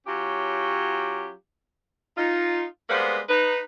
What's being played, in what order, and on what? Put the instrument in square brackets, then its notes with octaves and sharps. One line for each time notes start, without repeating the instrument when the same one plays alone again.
[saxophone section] F#3 C#4 F4 G4
D#4 F4
G3 G#3 A#3 B3 B4 C5
D#4 B4